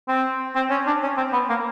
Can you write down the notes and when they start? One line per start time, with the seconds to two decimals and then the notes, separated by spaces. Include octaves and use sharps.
0.08 C4
0.56 C4
0.70 C#4
0.87 D4
1.03 C#4
1.17 C4
1.33 B3
1.50 A#3